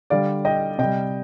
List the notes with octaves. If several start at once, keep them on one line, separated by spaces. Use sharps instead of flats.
D3 G3 D5 F5
D#5 G5
C3 G3 D#5 G5